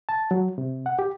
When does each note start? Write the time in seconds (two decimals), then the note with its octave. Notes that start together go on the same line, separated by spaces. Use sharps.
0.09 A5
0.31 F#3
0.58 C3
0.86 F#5
0.99 G4